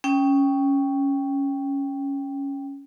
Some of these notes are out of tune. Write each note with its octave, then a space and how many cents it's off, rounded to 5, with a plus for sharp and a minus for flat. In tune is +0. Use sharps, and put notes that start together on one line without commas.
C#4 +0 G5 +0